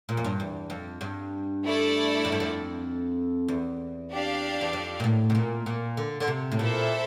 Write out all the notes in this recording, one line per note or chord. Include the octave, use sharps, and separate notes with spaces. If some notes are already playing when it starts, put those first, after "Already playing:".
A#2
F2
G2
E2
F2
G2
A3 E4 A4 D5
F2
G2
F2
E2
D4 G4 D5 F5
E2
F2
A#2
A2
C3
A#2
A#2
D3
D3
C3
A2
A#2 E4 A4 C5 E5